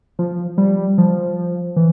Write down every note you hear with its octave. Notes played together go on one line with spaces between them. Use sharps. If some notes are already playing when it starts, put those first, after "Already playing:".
F3
G3
F3
E3